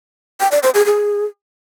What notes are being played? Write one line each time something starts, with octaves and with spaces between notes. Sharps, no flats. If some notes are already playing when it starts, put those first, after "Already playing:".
G5
D5
C5
G#4
G#4